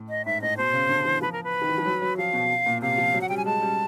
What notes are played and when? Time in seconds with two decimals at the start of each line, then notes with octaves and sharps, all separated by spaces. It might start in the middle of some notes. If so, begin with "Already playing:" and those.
Already playing: A2
0.09 D#5
0.25 G#2 E5
0.42 A2 D#5
0.57 B2 C5
0.73 C#3
0.89 D3
1.05 E3
1.21 F3 B4
1.32 A#4
1.44 B4
1.62 D#3
1.69 E3
1.78 F3
1.86 F#3
2.02 F#3
2.17 F3 F5
2.33 B2
2.66 A#2
2.82 C3 F5
2.98 F3
3.14 F#3
3.21 F#5
3.29 G3 G5
3.37 G#5
3.45 G#3 A5
3.62 G3